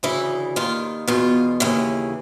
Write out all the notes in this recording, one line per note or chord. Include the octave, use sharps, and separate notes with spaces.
D2 C#3 E3 E4
D#2 D#3 F4
E2 B2 F4
D#2 C#3 E3